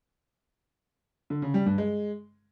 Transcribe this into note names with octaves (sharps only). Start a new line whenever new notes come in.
D3
C#3
G3
G2
G#3